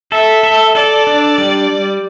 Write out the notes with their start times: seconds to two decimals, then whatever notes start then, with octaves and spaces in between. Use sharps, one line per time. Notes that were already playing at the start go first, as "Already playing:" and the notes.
0.12 A4 E5
0.43 A4
0.75 A4 D5
1.07 D4
1.38 G3